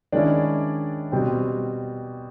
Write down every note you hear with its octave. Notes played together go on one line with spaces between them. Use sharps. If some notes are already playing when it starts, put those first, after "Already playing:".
D#3 G#3 C#4 D4 E4 D5
B2 G3 C4